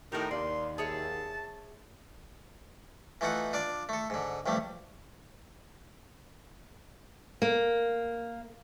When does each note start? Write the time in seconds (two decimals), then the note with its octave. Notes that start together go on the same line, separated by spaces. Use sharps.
0.12 A2 D#3 D#4 E4 G4 A#4
0.31 D#2 D5 C6
0.78 G#4 C#5 E5 A5
3.21 E3 A3 D#4 F4 F#5
3.53 D4 F4 D5
3.89 A3 A4
4.10 G#2 D3
4.46 A1 F2 G3 A3
7.42 A#3